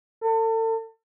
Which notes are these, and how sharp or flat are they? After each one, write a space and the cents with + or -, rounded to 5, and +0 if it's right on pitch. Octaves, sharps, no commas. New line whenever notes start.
A4 +35